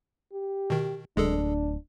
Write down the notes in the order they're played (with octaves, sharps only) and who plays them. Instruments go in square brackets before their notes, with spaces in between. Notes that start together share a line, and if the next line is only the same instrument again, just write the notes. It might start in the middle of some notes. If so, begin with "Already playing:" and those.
[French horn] G4
[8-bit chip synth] B2 D#3
[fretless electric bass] D1 [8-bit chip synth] G#3 G#4 A4 [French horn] D4